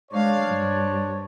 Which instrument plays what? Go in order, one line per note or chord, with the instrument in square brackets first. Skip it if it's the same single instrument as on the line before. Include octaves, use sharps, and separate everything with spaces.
[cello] G#3 F5 [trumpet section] D4 C5 C#5
[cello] G2